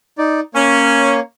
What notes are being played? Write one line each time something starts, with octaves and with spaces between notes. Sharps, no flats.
D#4 D5
A#3 C#4 C#5